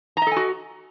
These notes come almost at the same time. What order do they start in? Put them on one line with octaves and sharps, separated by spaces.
A#5 D#5 A4 G#5 F#4